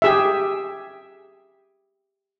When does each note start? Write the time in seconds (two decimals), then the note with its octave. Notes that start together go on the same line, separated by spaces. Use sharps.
0.02 G4 G#4 E5